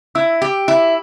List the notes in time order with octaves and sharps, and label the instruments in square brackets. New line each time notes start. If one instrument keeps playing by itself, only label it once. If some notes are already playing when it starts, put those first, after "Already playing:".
[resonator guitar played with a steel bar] E4 [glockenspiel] E6
[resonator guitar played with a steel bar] G4
E4